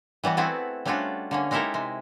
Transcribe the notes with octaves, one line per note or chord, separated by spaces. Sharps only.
E3 G3 B3 F#4
A3 B3 C4 E4 F#4 G#4
G3 A3 C#4 D4 F4 F#4
D3 A#3 C#4
G#3 D#4 E4 G4 A4 A#4
C3 G#3